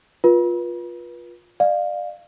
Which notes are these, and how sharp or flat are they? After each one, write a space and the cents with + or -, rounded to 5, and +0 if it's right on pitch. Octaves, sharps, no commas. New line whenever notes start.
F4 +10 B4 -35
D5 +45 F5 +0